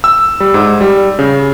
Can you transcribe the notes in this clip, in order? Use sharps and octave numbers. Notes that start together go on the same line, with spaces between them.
E6
G3
G#2
G3
C#3